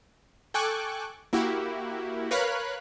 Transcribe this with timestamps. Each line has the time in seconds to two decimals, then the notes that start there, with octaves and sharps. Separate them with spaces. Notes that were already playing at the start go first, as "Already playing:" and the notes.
0.54 A4 G5 G#5 C#6 D6 F#6
1.33 A#3 E4 F#4 G4
2.31 A#4 B4 C#5 F5 B5 F#6